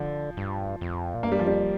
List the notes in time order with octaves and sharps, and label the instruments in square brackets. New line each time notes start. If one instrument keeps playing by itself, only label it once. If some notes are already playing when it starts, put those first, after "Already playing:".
Already playing: [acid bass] D3 [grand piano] F3
[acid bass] G2
F2
A#2
[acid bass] G2 [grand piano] A#3
[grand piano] G3
F3
[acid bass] F2 [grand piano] G3